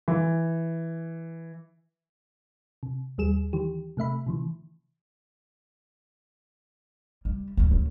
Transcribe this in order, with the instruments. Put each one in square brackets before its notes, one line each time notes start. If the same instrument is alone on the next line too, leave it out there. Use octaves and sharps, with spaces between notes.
[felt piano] E3
[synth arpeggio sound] C3
D#2 G3 G#4 E7
D#3 E3 G4
C3 A3 E5 B5
C3 D#3 E3
[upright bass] G3
D1 E3
F#2